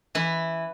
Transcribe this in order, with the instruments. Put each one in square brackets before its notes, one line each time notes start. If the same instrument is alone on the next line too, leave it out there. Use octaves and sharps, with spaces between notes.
[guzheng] E3 E4